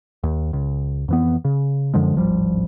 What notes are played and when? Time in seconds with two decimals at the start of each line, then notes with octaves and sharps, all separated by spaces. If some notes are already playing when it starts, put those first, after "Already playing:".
0.23 D#2
0.53 C#2
1.08 F2 E3 B3
1.45 C#3
1.94 F#2 D3 F3 G#3
2.14 D1 G#1 F3 G3